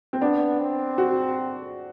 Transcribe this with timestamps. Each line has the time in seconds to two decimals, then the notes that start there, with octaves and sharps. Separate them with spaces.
0.13 C4
0.21 B3 D4
0.60 C4
0.98 F#4